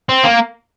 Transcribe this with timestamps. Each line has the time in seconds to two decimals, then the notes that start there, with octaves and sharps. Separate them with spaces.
0.09 C4
0.24 A#3